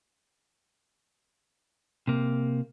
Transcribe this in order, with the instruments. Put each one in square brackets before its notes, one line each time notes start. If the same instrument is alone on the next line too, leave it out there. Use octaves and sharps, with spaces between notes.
[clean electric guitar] C3 A#3